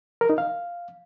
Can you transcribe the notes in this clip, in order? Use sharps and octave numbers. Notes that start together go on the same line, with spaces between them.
A#4
D#4
F5